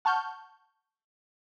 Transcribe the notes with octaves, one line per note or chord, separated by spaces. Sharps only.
F#5 A5 C#6 F6 G6